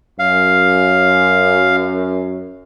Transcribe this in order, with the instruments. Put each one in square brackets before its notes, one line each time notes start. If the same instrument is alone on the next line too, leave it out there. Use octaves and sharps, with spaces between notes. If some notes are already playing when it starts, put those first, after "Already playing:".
[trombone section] F#2 [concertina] F5